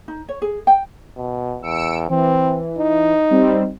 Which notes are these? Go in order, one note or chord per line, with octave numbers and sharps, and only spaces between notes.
D#4
C#5
G#4
G5
B2
E2 E6 C#7 D7
E3 C4
D#4
G3 C4